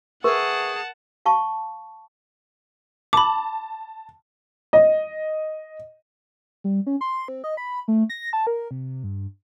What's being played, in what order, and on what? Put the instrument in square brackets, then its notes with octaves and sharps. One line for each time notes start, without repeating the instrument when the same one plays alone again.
[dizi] G#4 [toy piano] A#4 [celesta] B4 E5 C#6 [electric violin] F#5 A5
[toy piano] F5 A5 C#6
[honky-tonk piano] A5 [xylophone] B5 D6
[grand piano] D#5
[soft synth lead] G3
C#4
C6
C4
D#5
B5
A3
A#6
A5
A#4
C3
G2